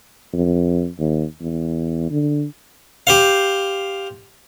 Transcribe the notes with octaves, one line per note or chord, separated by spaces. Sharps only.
F2
D#2
E2
D3
G4 C5 F5